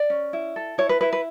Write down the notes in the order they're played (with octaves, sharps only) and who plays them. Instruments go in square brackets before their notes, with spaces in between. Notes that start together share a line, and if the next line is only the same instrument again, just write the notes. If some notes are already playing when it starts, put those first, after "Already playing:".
Already playing: [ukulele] D5
C#4
E4
A4
E4 C#5
B4
E4 B4
B4